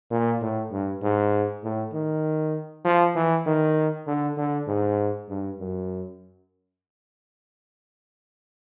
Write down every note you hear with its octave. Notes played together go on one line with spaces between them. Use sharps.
A#2
A2
G2
G#2
A2
D#3
F3
E3
D#3
D3
D3
G#2
G2
F#2